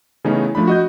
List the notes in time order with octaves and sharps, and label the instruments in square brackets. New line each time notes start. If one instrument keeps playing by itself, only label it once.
[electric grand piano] C#3 E3 A3 B3 C#4 D#4
F3 A3 D4 B5
F#4 D#5 G6